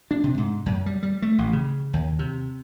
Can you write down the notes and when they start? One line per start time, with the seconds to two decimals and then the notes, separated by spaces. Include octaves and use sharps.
0.11 D4
0.24 C3
0.38 G#2
0.66 F#2
0.86 G3
1.03 G3
1.22 A3
1.38 A1
1.53 C#3
1.93 D#2
2.19 C3